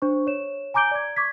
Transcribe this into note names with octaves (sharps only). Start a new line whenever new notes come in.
D4 C5 C#6
C#5 E7
G#5 A#5 D6 G6 D7 G7
D5 G#6
C#6 D6 G#6 B6